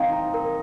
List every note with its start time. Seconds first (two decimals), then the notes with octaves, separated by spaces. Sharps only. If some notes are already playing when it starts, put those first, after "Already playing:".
Already playing: C4 D#4 F5 G5
0.13 A#5
0.34 A#4